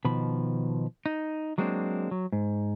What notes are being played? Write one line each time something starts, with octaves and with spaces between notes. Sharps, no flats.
B2 D#3 F3 B5
D#4
F#3 G#3 A#3 C4 D4
F#3
G#2